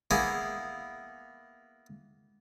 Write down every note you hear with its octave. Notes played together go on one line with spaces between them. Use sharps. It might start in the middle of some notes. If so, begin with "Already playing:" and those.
A#3 B3 E4 G#4 A#4 G#5